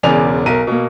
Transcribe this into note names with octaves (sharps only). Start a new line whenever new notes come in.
E1 E2 C#3 D5 G#5 F7
B1 A#4 D#7
B2 A#3